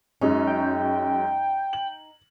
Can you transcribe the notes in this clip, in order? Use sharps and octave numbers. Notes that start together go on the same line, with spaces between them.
F#2 G#3 C#4 D#4
G5
F#7